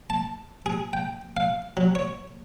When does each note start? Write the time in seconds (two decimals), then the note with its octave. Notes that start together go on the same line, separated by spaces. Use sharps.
0.10 A5
0.66 G#4
0.93 G5
1.37 F5
1.77 F#3
1.95 C#5